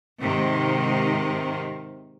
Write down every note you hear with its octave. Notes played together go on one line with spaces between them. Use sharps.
G#2 C3 D#3